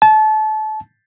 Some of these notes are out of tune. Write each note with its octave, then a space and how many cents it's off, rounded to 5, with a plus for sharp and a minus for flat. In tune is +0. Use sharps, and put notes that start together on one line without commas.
A5 -30